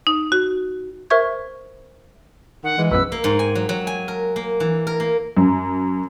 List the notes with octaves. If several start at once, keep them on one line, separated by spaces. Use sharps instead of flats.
D#4
F#4
A#4 C5 E5 C#6 G#6
D#3 F#5
E3 G#3
B1 F#2 B4 E6
A#3
G#2
G#5
F#3
F#3
G#5
A#4
A#3
E3
A#4
A#3
F#2